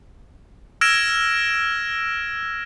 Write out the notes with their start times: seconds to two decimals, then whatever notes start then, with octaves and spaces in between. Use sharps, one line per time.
0.81 E6 F6 G#6 A#6 D7 E7